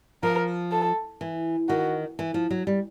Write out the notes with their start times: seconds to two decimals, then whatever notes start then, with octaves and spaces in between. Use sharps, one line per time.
0.23 F3 A#4
0.72 A4
1.21 E3
1.69 D#3 F#4
2.19 E3
2.34 F3
2.51 F#3
2.67 G3